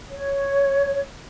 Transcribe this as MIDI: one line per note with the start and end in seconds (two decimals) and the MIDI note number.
0.11 1.03 73